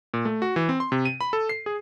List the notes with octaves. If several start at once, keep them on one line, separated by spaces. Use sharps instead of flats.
A#2
A3
F#4
E3
C4
C6
C3
D#7
B5
A4
C7
G#4